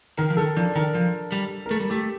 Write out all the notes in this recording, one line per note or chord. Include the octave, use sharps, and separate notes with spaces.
D#3 A#4
F3
D#3 A4
F3 D4
D#3 A#4
F3
G3
A#4
A3 A4
G3
A3 G4